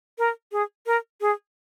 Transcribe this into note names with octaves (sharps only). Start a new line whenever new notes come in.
A#4
G#4
A#4
G#4